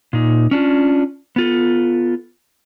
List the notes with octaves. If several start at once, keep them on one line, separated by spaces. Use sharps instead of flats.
A#2 D#4
C#4 D4 F4
B3 F4 A4